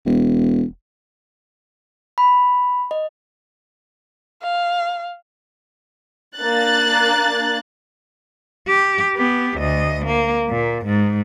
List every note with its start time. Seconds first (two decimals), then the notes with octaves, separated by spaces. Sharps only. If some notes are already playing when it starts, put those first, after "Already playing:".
0.06 E1
2.18 B5
2.91 D#5
4.42 F5
6.38 A#3 D4 F#6 A6
8.68 G4
9.16 B3 G4
9.59 D2 D#5
10.06 A#3
10.49 A#2
10.86 G#2